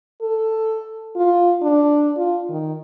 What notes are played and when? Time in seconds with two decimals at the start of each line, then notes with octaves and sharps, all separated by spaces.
0.21 A4
1.16 F4
1.62 D4
2.17 F4
2.49 D#3